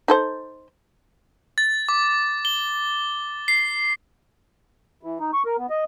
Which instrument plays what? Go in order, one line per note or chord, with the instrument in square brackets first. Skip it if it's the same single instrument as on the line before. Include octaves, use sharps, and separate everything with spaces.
[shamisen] D#4 A4 C5
[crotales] A6
D6
G7
C7
[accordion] E3
D#4
C#6
A#4
B3
D#5